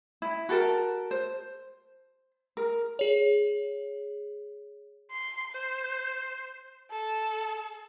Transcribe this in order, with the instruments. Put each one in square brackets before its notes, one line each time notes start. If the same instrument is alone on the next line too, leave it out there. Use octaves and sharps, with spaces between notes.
[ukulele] E4
F#4 A4 A#4 A5
C5
A#4
[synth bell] G#4 C#5
[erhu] C6
C5
A4